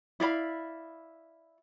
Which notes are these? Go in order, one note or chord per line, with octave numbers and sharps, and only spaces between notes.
E4 D5 F5 B5